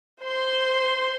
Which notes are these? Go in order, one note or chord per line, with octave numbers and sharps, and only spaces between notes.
C5 C6